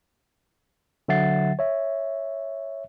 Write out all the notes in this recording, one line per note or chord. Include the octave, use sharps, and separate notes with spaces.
D3 F#3 E5 F#5 A6 C7
C#5 E5